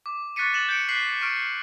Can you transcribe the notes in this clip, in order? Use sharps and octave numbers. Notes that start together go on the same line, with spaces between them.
D6
C#6 F#6 A6 B6 C#7 D#7
A6 E7 F#7
G6 C#7 D7
F#6 B6 C7 F#7
C#6 F6 D7